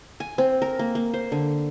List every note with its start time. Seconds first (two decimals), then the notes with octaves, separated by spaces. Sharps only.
0.20 G#5
0.38 C4
0.62 A#4
0.79 A#3
0.95 A#3
1.14 C5
1.32 D3